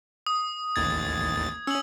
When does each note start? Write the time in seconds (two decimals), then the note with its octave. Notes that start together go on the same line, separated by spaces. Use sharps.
0.27 D#6
0.76 A1 D#2 G#6 A6
1.67 C#4 E6 F#7